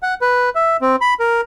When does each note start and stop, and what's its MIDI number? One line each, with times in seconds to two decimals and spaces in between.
0.03 0.14 78
0.21 0.50 71
0.55 0.77 76
0.81 0.96 60
1.01 1.14 83
1.20 1.41 70